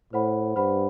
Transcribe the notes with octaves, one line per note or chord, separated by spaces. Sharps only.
A2 C5 F#5 B5
G2 C5 F#5 B5